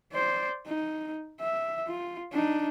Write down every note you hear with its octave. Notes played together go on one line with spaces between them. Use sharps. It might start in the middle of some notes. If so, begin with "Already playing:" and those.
C5 D5
D#4
E5
F4
D4 D#4